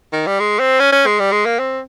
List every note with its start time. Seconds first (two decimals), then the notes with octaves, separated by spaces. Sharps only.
0.13 D#3
0.27 G3
0.40 G#3
0.60 C4
0.80 C#4
0.92 C#4
1.06 G#3
1.19 G3
1.32 G#3
1.46 A#3
1.59 C4